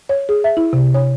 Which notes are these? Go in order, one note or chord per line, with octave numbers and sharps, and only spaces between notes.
C#5
G#4
E5
E4
C3
C#5